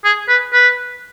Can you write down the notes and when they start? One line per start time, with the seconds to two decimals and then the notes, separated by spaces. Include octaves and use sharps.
0.04 G#4
0.28 B4
0.53 B4